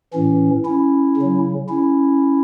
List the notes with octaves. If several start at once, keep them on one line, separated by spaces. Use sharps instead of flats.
A2 E3 C#4
C#4 E4
C#3 F#3
C#4 E4